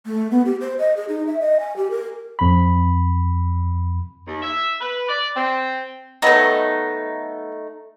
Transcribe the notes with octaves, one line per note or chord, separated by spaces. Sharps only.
A3
B3
G4
C5
D#5
G#4
D#4
E5
D#5
G#5
G4
A#4
F2 B5
D#2
E5
B4
D5
C4
D#3 F#3 A3 B3 D#4